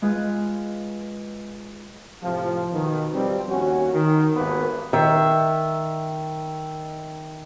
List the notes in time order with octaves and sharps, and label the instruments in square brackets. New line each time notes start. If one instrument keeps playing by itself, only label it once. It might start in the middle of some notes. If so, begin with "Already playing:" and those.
[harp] G#3 F4 B4
[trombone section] A2 C3 F3
B2 D#3
F3 G3 C4
D#2 C#4 F#4
D#3
G#1 D#2 A#3 B3 B4
[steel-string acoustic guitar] D#3 E5